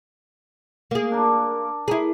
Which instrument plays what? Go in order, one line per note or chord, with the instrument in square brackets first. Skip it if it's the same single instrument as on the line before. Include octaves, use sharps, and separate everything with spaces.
[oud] A#3 G#4
[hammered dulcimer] D4 A#4
[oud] E4 G#4 [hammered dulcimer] A#4